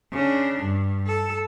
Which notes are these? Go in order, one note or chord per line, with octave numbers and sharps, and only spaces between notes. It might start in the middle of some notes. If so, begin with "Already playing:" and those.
C#3 D4
G2
A4